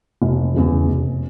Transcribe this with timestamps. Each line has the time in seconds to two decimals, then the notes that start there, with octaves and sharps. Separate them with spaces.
0.22 F1
0.54 E2 C#3 E3
0.88 F1